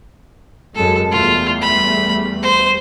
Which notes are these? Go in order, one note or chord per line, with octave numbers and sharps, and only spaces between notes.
F#2 G#3 A4
E2 G3 A3 F4
B5
C5